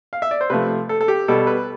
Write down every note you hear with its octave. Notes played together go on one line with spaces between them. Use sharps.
F5
E5
D5
C5
C3 F3 A3 B4
A4
A4
G4
B2 G3 A4
B4